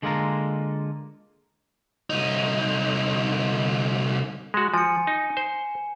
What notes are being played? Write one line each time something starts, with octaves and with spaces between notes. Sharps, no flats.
D3 G#3 A#3 F4 A4 A#5
C2 D#4
G#3 F#4
F3 G#5 C#7
D#4
C5